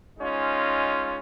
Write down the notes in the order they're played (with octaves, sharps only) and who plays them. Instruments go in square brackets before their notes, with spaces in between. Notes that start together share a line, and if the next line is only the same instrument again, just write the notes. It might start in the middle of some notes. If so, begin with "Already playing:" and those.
[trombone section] G#3 C#4 D#4 F4